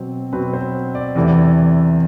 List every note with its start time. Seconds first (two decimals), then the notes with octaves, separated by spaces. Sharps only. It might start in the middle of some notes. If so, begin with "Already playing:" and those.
Already playing: B2 F#3 C4 C5
0.33 B2 F#3 C4 B4
0.53 C5
0.95 D5
1.16 E2 C3 E3 A3 E4